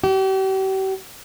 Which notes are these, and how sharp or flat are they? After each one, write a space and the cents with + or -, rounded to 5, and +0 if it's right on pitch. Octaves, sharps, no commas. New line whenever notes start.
G4 -40